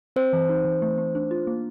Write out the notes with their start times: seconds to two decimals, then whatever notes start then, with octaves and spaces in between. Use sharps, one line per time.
0.16 C4 C5
0.33 E3
0.49 D#4
0.65 E3
0.82 A3
0.98 A3
1.15 D4
1.31 F4
1.47 A#3